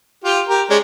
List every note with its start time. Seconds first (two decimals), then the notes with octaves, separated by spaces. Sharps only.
0.24 F4 G4
0.48 G4 A#4
0.70 G#3 C#4 D5